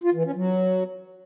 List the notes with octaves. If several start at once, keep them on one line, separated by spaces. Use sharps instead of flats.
F4
E3
C#4
F#3